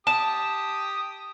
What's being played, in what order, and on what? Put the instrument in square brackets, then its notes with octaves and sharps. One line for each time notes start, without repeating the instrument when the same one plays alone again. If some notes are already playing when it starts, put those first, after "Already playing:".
[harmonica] G4 D#6 [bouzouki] A5